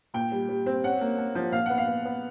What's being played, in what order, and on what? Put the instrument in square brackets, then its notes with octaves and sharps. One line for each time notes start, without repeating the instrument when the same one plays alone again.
[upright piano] A#2 G5
G3
G3
C4
C#4 F#5
A#3
A#3
F3
A#2 F5
B3 F#5
F5
B3
B3